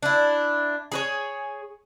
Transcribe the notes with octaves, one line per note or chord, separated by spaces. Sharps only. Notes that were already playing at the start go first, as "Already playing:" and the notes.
D4 E4
G#4 B4 C#5